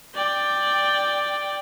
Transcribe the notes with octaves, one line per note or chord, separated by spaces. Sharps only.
D5 G5